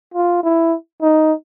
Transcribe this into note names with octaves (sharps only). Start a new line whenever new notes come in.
F4
E4
D#4